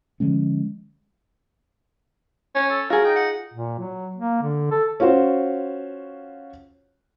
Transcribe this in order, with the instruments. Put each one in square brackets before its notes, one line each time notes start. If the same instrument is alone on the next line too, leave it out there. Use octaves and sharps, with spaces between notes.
[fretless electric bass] D3 F3 G#3 C#4
[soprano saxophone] C#4 [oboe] G#5
[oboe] A4
[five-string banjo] F4 G#4 [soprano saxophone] F#4 [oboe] A#4
[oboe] D#4 [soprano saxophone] G5
[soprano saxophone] F#5
[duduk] A#2
F#3
A#3
D3
A4
[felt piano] C#4 F4 F#4 C5